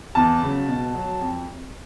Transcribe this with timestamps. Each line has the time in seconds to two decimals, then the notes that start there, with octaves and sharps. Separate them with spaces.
0.15 E2 A5
0.42 C#3 F#3
0.68 B2
0.95 F#3
1.21 F2